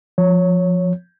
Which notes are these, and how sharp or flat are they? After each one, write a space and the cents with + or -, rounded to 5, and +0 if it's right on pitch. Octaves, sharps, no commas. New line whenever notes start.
F3 +10 C#5 +0